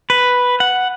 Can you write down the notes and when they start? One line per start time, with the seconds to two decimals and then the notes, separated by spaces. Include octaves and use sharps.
0.10 B4
0.60 F#5